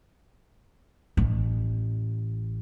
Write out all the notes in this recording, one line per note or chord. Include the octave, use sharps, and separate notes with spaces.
A1